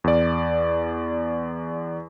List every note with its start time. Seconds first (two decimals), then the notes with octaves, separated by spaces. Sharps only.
0.04 E2 D5